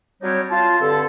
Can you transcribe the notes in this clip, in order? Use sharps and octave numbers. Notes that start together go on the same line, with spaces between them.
F#3 G3 C4 D4 D#4 C#5
F4 A5
G2 D3 C4 A4